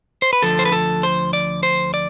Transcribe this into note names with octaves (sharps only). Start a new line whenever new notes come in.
C5
B4
D2 D3 F3 A4
C5
B4
A4
C5
D5
C5
D5